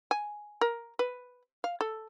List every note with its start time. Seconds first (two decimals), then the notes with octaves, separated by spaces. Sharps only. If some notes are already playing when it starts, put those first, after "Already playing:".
0.11 G#5
0.61 A#4
0.99 B4
1.64 F5
1.81 A4